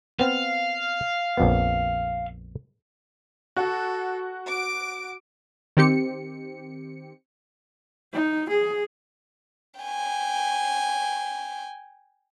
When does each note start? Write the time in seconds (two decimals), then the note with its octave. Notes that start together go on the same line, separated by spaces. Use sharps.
0.19 B3 C4 F5
1.37 A#1 F2 B3
3.56 F#4 A4
4.46 D6 D7
5.77 D#3 C4 G4 C#7
8.13 D#4
8.49 G#4
9.80 G5 G#5